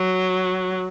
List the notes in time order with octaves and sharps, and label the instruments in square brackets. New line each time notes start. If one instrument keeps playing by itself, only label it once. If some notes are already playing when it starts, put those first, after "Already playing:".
Already playing: [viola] F#3